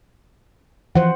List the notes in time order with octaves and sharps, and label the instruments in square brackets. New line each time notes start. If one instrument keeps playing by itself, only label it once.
[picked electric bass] E3 F3 [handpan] C5 F#5